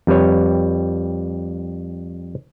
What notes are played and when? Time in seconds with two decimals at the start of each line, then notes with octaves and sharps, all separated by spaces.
0.07 F2 G3 B4 C#5